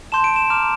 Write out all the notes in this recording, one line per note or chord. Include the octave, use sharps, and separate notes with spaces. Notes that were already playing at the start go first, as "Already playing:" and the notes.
A5 C6 G6 E7
D7
E7
A#5 D6 F6 E7